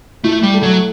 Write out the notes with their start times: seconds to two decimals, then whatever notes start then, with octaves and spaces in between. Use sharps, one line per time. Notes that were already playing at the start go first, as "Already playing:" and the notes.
0.24 A3 E4
0.43 G3
0.54 A3
0.63 F#3